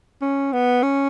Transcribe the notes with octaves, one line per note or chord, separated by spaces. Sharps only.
C#4
B3
C#4